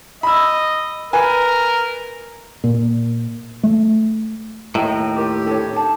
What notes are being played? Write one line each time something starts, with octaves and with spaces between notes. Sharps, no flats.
D#5 B5 E6
A#4 B4 G#5
A#2
A3
D#2 A2 D#5 G5 A#5
F4 G4 A#4
D4 E4 A4 C#5
D#4 C#5 A5